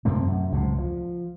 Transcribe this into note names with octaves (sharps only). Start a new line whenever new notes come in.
F#2 C3 A3 C4
F#2
C#2 F#2 A2 C3
F3